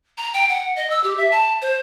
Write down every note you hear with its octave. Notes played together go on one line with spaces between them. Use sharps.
A#5
G5
F#5
D#5
E6
G4
E5
A5
C5